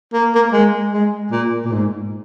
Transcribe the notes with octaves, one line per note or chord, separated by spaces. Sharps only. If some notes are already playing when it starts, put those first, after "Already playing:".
A#3
A#3
G#3
G#3
A#2
A#2
G#2